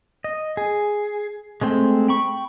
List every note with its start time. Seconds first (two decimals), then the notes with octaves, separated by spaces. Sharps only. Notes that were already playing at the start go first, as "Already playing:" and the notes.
0.24 D#5
0.57 G#4
1.61 G#3 A3 C4 G5
2.08 G5 B5 C#6